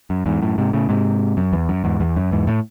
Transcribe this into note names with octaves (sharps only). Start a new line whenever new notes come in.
F#2
E2 G#2
F#2 A2
G#2 C3
A2 C#3
G#2 C3
F#2
E2
F#2
E2 G#2
E2
F#2
E2 G#2
A2